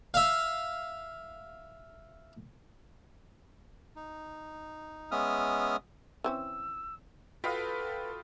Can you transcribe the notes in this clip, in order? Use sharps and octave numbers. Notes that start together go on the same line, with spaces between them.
E5 F5
D#4
G#3 B3 C#4 E5 D#6 F6
E3 C4 C#4 E6
F4 F#4 A4 B4 D#5 F5 G5 B5